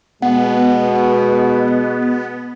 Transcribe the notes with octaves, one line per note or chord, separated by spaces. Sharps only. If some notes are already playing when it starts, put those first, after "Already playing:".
B2 G#3 B3 F#5